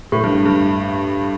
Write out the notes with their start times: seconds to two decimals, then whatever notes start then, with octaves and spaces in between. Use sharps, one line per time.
0.12 A2
0.24 G2
0.45 G2